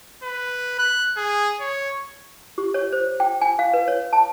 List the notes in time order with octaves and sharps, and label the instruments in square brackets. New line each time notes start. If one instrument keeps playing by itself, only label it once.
[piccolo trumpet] B4
F#6
G#4
C#5
[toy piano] G4
C#5
C5
G5
G#5
F5
B4
C#5
A5